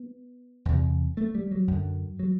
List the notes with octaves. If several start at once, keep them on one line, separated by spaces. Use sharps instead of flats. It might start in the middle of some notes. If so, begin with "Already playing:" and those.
Already playing: B3
E2 C3
A3
G3
F#3
F#2 D3
F#3